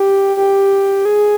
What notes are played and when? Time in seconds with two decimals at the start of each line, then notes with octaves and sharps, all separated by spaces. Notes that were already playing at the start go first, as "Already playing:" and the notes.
Already playing: G4
0.37 G4
1.05 G#4